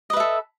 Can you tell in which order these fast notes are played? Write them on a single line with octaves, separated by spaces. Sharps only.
D#5 B4 E5 A4